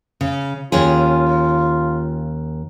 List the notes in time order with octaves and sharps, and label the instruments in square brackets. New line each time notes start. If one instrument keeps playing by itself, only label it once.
[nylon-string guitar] C#3
[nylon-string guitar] D#2 C#4 G#4 [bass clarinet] F4